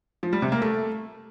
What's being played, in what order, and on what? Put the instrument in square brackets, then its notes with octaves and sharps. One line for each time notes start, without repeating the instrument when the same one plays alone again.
[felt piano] F3
G3
C3
A#3
A3